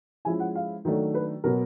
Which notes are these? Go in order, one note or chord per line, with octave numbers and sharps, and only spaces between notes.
F3 G#3 C#4 E4 G#5
F#5
F5
D#3 F#3 A3 D4
B4
B2 F#3 B3 A#4